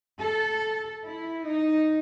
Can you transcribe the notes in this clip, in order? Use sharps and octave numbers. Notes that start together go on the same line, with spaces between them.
A4
E4
D#4